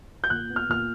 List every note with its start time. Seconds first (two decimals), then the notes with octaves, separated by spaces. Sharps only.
0.24 G6
0.30 A#2 F#6
0.50 B3
0.56 F6
0.69 A#2 F6